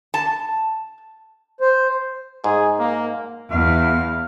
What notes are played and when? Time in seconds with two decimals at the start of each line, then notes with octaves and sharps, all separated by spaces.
0.14 A5
1.60 C5
2.44 G#2 G#4
2.79 A#3
3.50 E2 F5